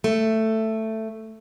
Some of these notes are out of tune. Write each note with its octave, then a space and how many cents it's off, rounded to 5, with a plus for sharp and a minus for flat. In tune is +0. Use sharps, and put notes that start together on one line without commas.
A3 +10